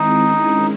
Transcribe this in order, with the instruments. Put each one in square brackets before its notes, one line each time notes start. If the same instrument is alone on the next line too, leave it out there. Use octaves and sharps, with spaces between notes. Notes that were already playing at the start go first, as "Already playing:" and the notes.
Already playing: [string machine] D#3 G#3 C4 E4 [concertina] D#4
[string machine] D#3 G#3 C#4 E4